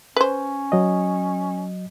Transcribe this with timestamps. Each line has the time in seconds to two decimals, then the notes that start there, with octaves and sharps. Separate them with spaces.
0.16 C#4 B4 C5
0.72 F#3 D#5